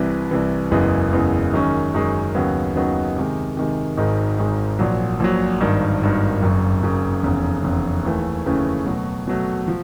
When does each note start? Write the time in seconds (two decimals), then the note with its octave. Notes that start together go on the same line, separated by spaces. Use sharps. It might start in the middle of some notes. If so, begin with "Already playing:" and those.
Already playing: C2 C3 E3
0.31 C2 C3 E3
0.71 F#1 E2 C#3 E3 G#3
1.12 F#1 E2 C#3 E3 G#3
1.54 F#2 D#3 G#3 C#4
1.94 F#2 D#3 G#3 C#4
2.35 D#2 C#3 F#3 B3 D#4
2.75 D#2 C#3 F#3 B3 D#4
3.16 C3 D#3 G#3
3.57 C3 D#3 G#3
3.97 G#1 G#2 D#3 G#3
4.38 G#1 G#2 D#3 G#3
4.79 A#1 A#2 F#3
5.20 A#1 A#2 F#3
5.61 G#1 G2 D#3
6.01 G#1 G2 D#3
6.42 F#1 F#2 C#3
6.83 F#1 F#2 C#3
7.23 F1 E2 C#3
7.64 F1 E2 C#3
8.05 D#2 C#3 E3 A3 C#4
8.45 D#2 C#3 E3 A3 C#4
8.86 B2 F#3 A3
9.27 B2 F#3 A3
9.68 F3